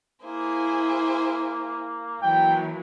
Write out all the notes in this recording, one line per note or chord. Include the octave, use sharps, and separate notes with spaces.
A#3 E4 G#4 C5
E3 F#3 A#3 G5